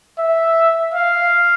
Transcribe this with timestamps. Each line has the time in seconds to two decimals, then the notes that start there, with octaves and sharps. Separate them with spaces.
0.18 E5
0.94 F5